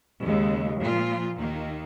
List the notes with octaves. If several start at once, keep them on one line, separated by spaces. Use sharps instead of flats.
D#2 C#3 G#3
A#2 F3 A#3 F4
D#2 D#3 A#3